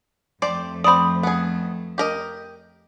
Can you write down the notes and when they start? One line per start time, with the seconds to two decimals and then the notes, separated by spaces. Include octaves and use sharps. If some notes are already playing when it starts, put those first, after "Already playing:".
0.42 F2 A3 G4 C5 D5
0.84 C4 D5 B5 D#6
1.23 B3 G#4
1.98 G4 A#4 D#5